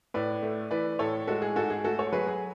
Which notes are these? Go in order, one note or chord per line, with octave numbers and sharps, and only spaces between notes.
A2 B4 D5
A3
E3 B4 D5
A2 A4 C#5
G#3 F#4 A4
G#4
G#2 F#4 A4
G#4
A3 F#4 A4
A4 C#5
F#3 G#4 B4
G#4